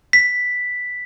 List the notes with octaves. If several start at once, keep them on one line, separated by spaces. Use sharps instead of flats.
B6